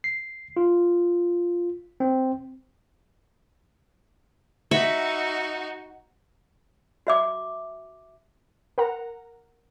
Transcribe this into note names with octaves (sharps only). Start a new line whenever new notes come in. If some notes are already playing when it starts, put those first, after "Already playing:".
C7
F4
C4
D#4 F#4 E5 B5 C#6
F#4 E5 D6
A#4 F#5 A#5